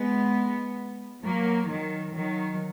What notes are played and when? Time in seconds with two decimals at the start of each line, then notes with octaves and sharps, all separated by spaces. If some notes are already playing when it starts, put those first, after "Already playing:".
Already playing: G#3 B3
1.22 F#3 A#3
1.68 D#3 F#3
2.14 D#3 F#3